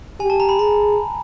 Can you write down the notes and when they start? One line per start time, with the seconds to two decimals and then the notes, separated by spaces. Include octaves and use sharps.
0.20 G4 G#5
0.30 A5
0.40 A#5
0.49 B5
0.59 G#4 A#5